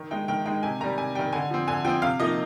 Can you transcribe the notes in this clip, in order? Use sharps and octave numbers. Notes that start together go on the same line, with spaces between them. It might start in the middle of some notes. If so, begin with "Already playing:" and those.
Already playing: D#3
G#3 D#4 G5
D#3 G5
G#3 D#4 G5
C3 G#5
D#3 G3 A#5
C3 G#5
D#3 G3 G5
D3 G#5
F3 C4
D3 G#5
F3 C4 G5
C3 F5
F3 A#3 D#4 D#5